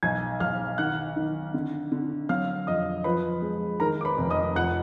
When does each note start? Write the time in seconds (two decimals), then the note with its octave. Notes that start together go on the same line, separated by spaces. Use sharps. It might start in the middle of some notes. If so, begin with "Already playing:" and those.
0.03 B1 G#5 G#6
0.40 B1 F5 F6
0.78 D#3 F#5 F#6
1.16 D#3
1.54 D3
1.92 D3
2.29 F#3 F5 F6
2.67 F2 D#5 D#6
3.04 F3 B4 B5
3.42 G#3
3.80 D#3 A#4 A#5
4.01 D6
4.05 B4 B5
4.18 F1
4.30 D#5 D#6
4.55 F2 F#5 F#6